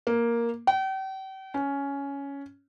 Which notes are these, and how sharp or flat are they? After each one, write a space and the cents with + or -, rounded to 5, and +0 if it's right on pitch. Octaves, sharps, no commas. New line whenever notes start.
A#3 +5
G5 -40
C#4 +10